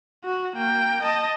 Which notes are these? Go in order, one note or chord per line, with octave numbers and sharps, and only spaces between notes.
F#4
A#3 G5
D#5 A5